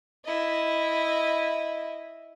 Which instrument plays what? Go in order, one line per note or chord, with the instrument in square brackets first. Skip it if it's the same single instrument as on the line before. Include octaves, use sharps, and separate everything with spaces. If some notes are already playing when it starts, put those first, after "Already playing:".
[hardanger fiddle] E4 D#5